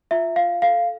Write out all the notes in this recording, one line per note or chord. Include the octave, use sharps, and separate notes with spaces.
F4 E5
F4 F5
A4 F5